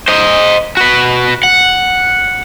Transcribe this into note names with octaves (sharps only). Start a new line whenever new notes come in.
C5 D#5
F#4 B4
F#5